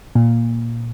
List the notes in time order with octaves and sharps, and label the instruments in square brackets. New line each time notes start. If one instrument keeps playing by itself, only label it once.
[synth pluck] A#2